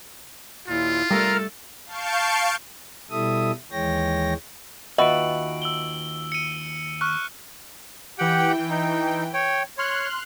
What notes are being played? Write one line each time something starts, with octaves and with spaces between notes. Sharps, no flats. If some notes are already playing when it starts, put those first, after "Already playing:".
D#2 A#2 E4 F4
G3 A3 A4 A#4 A#5 F6
F5 A5 C#6 G6 C7 D7
B2 G3 E4 A4 E5 D#6
D#2 E3 G#3 C#5 G5 A#6
D#2 F4 F#4 B4 D#5 E5 D7 F#7
E6 F#7 G7
C#7 D#7
C#6 F6 F#6
E3 G4 F#5 G5
D#4
C#5 G5
C#5 C6 F6 F#6